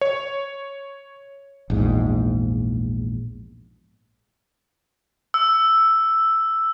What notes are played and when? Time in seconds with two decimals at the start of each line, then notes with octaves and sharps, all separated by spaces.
0.01 C#5
1.70 A#1 E2 G#2
5.34 E6